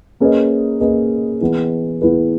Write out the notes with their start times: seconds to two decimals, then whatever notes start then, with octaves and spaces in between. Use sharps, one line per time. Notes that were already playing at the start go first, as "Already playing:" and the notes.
0.20 A#3 C#4 G#4 B4 D#5
0.80 A#3 C#4 G#4 B4 D#5
1.41 E3 B3 E4 G#4 B4
2.02 E3 B3 E4 G#4 B4